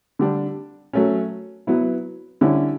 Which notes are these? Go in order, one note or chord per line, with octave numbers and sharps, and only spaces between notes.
D3 G3 D4
F#3 A3 C#4
F#3 B3 E4
D3 G3 C#4 E4